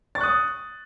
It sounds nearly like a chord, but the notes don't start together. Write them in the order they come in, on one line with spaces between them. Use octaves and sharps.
A6 C#6 F#6 D#6